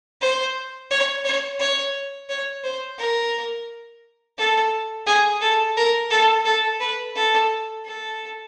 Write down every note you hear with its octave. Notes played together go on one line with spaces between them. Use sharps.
C5
C#5
C#5
C#5
C#5
C5
A#4
A4
G#4
A4
A#4
A4
A4
B4
A4
A4